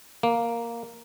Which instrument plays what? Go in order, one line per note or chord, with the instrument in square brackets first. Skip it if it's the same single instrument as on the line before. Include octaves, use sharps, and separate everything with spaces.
[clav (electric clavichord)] A#3